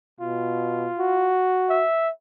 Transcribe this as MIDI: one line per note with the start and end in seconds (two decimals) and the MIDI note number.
0.20 0.90 47
0.20 1.36 65
0.99 1.84 66
1.70 2.10 76